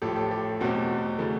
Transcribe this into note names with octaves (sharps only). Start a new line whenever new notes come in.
A1 A2 F3 G4 A4
G4 A4
G4 A4
E2 B2 F#3 A3 C4
C#3 E3 A3